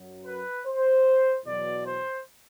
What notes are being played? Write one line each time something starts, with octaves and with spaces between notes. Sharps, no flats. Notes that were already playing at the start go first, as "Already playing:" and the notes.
Already playing: F#2 F#3
B4
C5
E2 B2 F#3 D5
C5